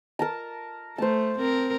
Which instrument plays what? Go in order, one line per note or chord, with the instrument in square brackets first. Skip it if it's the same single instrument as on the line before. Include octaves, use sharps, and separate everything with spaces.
[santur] A#4 A5 A#5
[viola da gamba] A3 [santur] C5 A5
[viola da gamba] C4 A#4